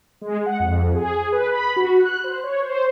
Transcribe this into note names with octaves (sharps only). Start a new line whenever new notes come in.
G#3
F#5
F2
G#4
B4
B5
F#4
F#6
C5
C#5
C5